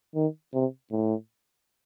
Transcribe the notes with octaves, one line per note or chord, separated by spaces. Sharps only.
D#3
C3
A2